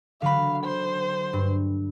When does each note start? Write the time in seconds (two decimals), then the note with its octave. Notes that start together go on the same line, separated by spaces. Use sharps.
0.22 D3 F#3 F5 B5
0.63 C5
1.33 G2